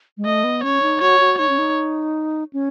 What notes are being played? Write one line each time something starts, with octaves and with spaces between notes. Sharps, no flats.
G#3
A3 D#5
B3
C#4 C#5
D#4
F#4 C#5
F#4
D#4 C#5
C#4
D#4
C#4